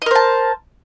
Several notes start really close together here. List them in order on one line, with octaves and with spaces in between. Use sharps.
D#5 A#4 C5 A5